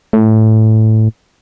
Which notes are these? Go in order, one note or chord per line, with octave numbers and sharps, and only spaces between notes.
A2